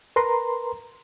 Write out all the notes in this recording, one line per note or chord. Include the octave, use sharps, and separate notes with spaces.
A#4 B4 A#5 C6